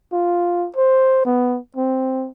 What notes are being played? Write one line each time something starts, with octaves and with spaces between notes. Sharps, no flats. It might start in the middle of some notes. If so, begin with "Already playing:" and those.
F4
C5
B3
C4